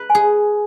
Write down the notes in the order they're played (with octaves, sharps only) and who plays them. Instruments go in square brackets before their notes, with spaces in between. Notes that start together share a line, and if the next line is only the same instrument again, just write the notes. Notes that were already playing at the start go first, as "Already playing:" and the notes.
Already playing: [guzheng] B4
[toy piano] G#5
[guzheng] G#4